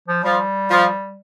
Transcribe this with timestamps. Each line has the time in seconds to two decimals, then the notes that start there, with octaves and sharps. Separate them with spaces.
0.08 F3
0.23 F3 G3
0.70 F3